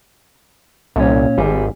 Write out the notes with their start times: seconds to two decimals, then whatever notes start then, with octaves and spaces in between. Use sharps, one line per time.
0.96 C2 A#2 C#4
1.38 G#1 G3 G#4